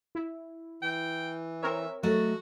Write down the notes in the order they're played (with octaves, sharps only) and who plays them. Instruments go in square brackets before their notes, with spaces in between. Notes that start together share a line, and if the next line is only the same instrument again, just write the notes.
[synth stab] E4
[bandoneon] E3 [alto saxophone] G5
[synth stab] C4 A#4 C#5 [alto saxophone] E5
[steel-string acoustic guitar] F#3 A3 D#5 [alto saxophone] F#4